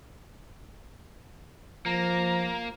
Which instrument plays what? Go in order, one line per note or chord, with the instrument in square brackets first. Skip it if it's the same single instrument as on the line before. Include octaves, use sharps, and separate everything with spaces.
[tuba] F3 [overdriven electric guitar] A#3 [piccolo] A#5